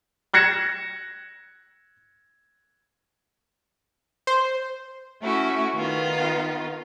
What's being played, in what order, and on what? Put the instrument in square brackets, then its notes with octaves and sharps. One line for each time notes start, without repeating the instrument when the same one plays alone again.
[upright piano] F#6 G#6 A#6 C#7 E7
[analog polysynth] C5
[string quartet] A3 C#4 E4 F#4
D#3 B3 F4